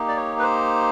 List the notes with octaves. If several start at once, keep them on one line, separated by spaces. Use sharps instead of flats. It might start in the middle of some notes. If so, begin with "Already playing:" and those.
Already playing: A#3 D#4 G4
D5
C#5
B4
C5